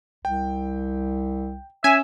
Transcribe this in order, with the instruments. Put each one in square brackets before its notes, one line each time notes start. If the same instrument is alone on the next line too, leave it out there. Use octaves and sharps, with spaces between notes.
[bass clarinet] C2 [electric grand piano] G5
[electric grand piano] C#4 [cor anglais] E5 [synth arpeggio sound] G#5